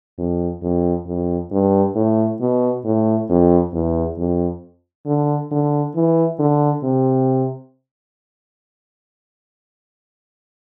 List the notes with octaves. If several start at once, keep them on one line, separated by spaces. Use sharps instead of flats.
F2
F2
F2
G2
A2
B2
A2
F2
E2
F2
D3
D3
E3
D3
C3